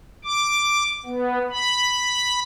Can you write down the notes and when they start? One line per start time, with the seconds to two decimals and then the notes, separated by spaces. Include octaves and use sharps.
0.24 D6
1.06 B3
1.51 B5